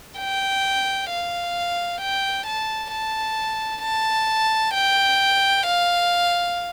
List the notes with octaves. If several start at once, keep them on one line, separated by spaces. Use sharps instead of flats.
G5
F5
G5
A5
A5
A5
G5
F5